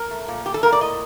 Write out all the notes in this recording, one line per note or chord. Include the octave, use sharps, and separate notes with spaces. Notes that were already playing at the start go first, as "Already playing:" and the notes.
Already playing: A#4
A3
A#2
A3 G4
A4
A#2 A#4
D5
A2 D#5